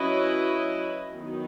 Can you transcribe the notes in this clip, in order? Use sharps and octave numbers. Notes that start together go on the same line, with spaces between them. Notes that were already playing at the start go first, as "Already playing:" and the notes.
Already playing: F#3 C#4 E4 B4 D#5
D#3 F#3 B3 D#4